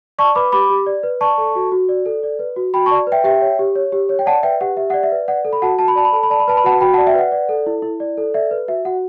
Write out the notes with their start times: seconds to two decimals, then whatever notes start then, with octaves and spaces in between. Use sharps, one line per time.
0.18 D5 A5 C#6
0.35 B4 B5 D6
0.52 G4 B5 D6
0.70 G4
0.86 D5
1.03 B4
1.21 D5 A5 C#6
1.38 A4
1.55 F#4
1.72 F#4
1.89 D5
2.06 A4
2.23 D5
2.39 B4
2.56 F#4
2.74 F#4 G5 B5
2.86 A5 C#6
2.91 D5
3.07 B4
3.12 E5 G5
3.24 G4 E5 G5
3.41 C#5
3.59 G4
3.75 C#5
3.92 G4
4.09 C#5
4.19 G5
4.26 D5 F#5 A5
4.43 B4 E5 G5
4.61 G4 F#5
4.77 G4 E5
4.90 D5 F#5
5.03 E5
5.12 B4
5.28 D5 F#5
5.45 A4
5.53 B5
5.62 F#4 F#5 A5
5.79 F#4 A5
5.88 B5
5.96 D5 A5
6.05 B5
6.13 A4 A5
6.23 B5
6.30 D5 A5
6.40 B5
6.48 B4 A5
6.57 B5
6.64 F#4 F#5 A5
6.80 F#4 G5 B5
6.93 F#5 A5
6.98 D5
7.07 E5 G5
7.14 B4 F#5
7.32 D5
7.49 A4
7.67 E4
7.82 E4
8.00 D5
8.17 A4
8.34 D5 E5
8.51 B4
8.68 F#4 E5
8.85 F#4 F#5